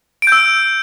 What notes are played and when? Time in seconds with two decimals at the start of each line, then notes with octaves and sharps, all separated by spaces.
0.22 D7
0.27 G6
0.32 E6